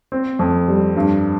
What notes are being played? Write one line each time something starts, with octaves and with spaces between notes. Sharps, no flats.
C4
F2
G3
G2